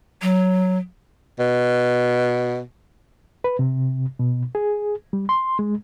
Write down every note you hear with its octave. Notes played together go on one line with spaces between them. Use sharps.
F#3
B2
B4
C3
B2
G#4
G3
C6
G#3